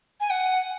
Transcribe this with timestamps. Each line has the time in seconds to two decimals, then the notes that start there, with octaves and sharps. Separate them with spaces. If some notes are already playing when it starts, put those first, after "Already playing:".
0.20 G#5
0.30 F#5